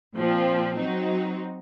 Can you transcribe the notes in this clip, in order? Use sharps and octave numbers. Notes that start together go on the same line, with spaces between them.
A#2 F3 C4
F#3 C4 D#4 F#4